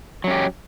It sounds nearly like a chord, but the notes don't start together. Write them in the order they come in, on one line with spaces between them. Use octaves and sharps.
F#3 C#4 G4